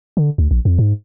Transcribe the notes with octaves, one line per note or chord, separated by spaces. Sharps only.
D3
D2
A#1
F2
G#2